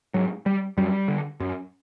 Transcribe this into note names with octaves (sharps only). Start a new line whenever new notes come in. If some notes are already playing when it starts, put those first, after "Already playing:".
G#2 F#3
G3
F#2 G3
D3
F#2